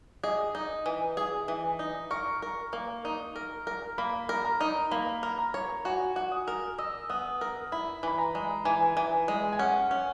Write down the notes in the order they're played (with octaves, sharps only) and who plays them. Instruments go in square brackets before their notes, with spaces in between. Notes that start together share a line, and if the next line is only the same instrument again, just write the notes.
[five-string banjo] G#4 [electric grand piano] D#5
[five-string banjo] D#4
E3
G#4
E3
D#4
[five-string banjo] A#4 [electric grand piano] C#6
[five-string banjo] A#4
A#3
D#4
A#4
A#4
[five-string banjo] A#3 [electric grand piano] B5
[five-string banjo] A#4
[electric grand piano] A#5
[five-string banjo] D#4
[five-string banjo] A#3 [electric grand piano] B5
[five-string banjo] A#4
[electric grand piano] A#5
[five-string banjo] C#5
[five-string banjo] F#4 [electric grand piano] G#5
[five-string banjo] F#4
[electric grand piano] D#6
[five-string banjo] A#4
[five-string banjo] D#5 [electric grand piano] E6
[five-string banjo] B3 [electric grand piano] D#6
[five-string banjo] A#4
[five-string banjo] E4 [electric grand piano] B5
[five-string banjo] E3 [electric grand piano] B5
[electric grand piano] A#5
[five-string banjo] G#3
[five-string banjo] E3 [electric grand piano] G#5
[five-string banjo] E3
G#3
[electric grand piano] G#5
[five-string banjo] C#4 [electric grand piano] F#5
[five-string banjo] C#4